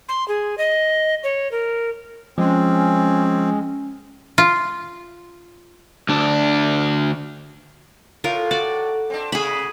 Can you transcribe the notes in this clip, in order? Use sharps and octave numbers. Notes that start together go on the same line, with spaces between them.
C6
G#4
D#5
C#5
A#4
F3 G#3 C4 C#4
F4
D2 D4
A2 F4 A#4
F#4 D5
C4 D4
C3 F#4 G#4 B5